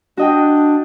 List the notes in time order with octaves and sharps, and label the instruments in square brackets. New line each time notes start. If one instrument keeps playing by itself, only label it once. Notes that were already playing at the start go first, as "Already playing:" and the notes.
[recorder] D4 [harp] F#4 D#5 G5